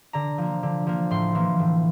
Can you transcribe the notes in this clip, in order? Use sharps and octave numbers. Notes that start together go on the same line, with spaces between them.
D3 A#5
F3 A#3
D3
F3 A#3
A2 C6
E3 A#3
A2